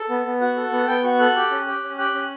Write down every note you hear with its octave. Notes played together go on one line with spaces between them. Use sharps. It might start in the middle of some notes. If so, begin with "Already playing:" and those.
Already playing: A4
B3
B3
F#4 F#5
A4
B3 F#5
B3 G5
F#4 C#6
A4 F#6
G4
C#4
G4
C#4
G4 F#6
C#4